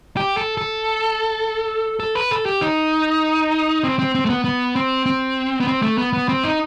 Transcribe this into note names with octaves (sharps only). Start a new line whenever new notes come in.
G4
A4
A4
A4
B4
A4
G4
D#4
C4
C4
C4
A3
B3
B3
C4
C4
B3
C4
A3
B3
B3
C4
D#4